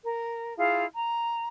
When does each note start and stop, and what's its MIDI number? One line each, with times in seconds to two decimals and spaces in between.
0.04 0.53 70
0.57 0.84 64
0.57 0.84 65
0.57 0.84 68
0.57 0.84 77
0.94 1.48 82